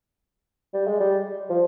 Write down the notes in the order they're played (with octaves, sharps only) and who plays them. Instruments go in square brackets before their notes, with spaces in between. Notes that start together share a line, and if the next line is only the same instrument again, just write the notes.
[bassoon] G3
G#3
G3
F3